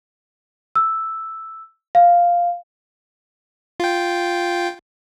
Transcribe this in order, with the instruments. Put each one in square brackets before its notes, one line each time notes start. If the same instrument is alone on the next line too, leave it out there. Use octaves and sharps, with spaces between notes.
[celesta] E6
F5
[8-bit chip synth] F4 G5